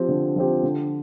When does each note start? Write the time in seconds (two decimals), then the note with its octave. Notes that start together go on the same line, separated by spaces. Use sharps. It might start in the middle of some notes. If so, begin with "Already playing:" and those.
Already playing: F3 C4 G4
0.09 D3
0.36 F3 C4 G4
0.63 D3